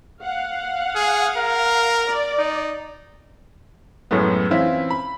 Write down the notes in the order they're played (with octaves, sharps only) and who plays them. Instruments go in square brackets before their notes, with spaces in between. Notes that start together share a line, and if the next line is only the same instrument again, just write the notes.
[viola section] F5 F#5
[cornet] G#4
A#4
[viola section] D5
[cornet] D#4
[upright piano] F#2 A2 G#3 A3 B3
E3 C4 C#4 E4 F4
B5